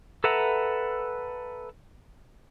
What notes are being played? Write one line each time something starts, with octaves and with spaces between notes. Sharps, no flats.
A4 B4 E5 F#5 A#5